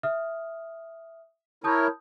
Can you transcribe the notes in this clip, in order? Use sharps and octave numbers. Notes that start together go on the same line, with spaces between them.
E5 D#6 F6
E4 A#4 C#5 A5 D#6 G6